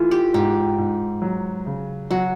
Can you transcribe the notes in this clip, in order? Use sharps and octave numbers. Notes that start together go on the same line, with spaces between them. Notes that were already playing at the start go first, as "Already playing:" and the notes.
Already playing: E3 A3 F4
G4
G#2 G4
G#2
F#3
C#3
F#3 F#4